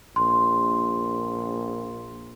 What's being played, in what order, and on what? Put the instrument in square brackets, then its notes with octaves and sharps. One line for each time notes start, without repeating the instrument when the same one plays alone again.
[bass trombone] A#1 [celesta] C6